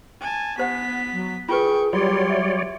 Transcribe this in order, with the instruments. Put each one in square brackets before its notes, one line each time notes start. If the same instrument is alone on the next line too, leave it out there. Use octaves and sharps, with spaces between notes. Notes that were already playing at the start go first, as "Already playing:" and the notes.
[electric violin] G#5 A5
[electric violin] B3 B6 [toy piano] G4 C5 F#5
[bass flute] F#3
[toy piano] F4 A#4 B4 [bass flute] G#4 [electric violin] G5 C#6
[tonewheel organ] F#3 C#5 D5 [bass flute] G3 [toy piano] F4 [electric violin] C6
[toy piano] E5